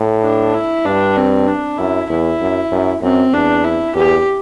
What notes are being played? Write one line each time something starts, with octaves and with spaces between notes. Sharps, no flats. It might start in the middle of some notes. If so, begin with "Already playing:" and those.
Already playing: A2
D4
E4
G2 D4
C4
D4
F#2 E4
E2 E4
F#2
F#2
F#2 C4
E2 D4
E4
E2 G4